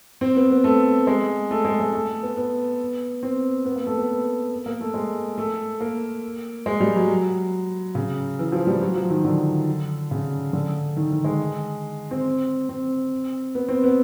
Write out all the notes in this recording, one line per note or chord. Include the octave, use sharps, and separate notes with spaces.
C4
B3
B3
A3
G#3
A3
G#3
G#3
A3
B3
B3
C4
B3
A#3
A3
B3
A#3
A3
G#3
A3
A#3
G#3
G3
F#3
C#3
E3
F3
G3
F#3
F3
D#3
D3
C#3
D3
D#3
D#3
G#3
C4
C4
B3
C4
B3